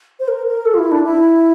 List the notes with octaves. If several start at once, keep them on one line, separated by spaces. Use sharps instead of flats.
C5
A#4
A#4
A4
F4
E4
D4
E4